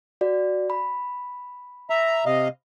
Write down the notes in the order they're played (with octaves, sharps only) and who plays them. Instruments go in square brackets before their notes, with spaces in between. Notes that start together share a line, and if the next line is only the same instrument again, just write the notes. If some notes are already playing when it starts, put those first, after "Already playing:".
[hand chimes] F#4 D5
B5
[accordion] E5 A#5
C3 D#5 F5